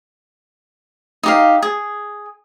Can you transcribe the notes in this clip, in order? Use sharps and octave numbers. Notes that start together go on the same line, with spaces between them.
D#4 G4 F5
G#4